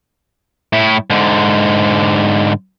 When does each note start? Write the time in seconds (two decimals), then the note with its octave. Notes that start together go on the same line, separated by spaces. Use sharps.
0.73 A2 E4
1.10 G#2 D3